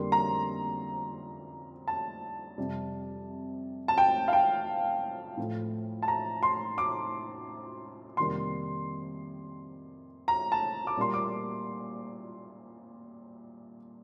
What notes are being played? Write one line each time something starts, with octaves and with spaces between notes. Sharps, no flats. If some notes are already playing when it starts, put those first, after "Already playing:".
Already playing: F2 D3 G3 A#3 C6
A#5
A5
F2 C3 G3
A5
G5
F5
G5
A2 F3 A3
A5
A#5
C6
D6
F2 C3 D#3 G3 A#3 C6
A#5
A5
D6
A#2 G3 A#3 C6
D6